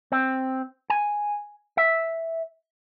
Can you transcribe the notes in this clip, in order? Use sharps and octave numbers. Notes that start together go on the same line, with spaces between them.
C4
G#5
E5